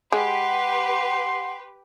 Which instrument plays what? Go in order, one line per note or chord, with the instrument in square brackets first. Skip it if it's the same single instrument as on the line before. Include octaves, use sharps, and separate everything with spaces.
[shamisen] G#3 [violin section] G4 B4 [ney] F#5 [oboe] C6